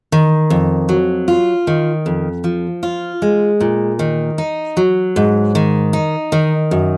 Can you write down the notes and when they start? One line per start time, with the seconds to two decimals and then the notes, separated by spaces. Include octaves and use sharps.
0.12 D#3
0.50 F2
0.89 F#3
1.28 F4
1.67 D#3
2.06 F2
2.44 F3
2.83 F4
3.22 G#3
3.60 A#2
3.99 D#3
4.38 D#4
4.77 F#3
5.16 G#2
5.55 D#3
5.93 D#4
6.32 D#3
6.71 F#2